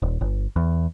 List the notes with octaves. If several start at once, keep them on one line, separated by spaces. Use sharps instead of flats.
D#1
G1
E2